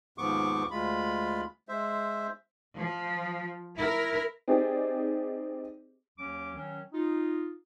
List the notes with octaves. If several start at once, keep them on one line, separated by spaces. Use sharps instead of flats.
D#2 G#2 F3 B3 C#6 D6
D2 G#3 F4 B5
G#3 C5 E5
F3
E4 A#4
C4 D#4 G4 G#4 D5
D#2 F#3 C#4 D6
D#3 F#3 C#4
D#4 F4